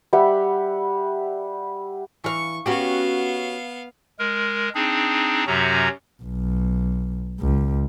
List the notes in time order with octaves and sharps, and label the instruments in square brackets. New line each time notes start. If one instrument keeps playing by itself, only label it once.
[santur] G3 E5 F#5 B5
[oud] E3 F5 [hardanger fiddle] C#6
[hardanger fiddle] B3 F5 [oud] C#4 F#4 G4
[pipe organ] G#3 A#4
C4 D4 D#4 G#4
F#2 C3 F#3 C#4 F#4 A#5
[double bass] B1
C#2